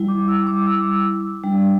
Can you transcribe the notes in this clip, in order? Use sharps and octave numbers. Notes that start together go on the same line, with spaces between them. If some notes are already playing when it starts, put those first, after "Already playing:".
Already playing: G3 E4
D6
E6
D6
E6
G3 D4